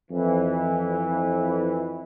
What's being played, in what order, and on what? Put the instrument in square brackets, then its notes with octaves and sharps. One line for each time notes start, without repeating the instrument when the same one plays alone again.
[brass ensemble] F2 E3